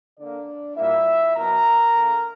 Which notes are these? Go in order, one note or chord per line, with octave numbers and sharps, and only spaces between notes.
D3 A#3 D4 D5
A#2 G3 A#3 E4 E5
B2 F#3 B3 A#4 A#5
D3 A#3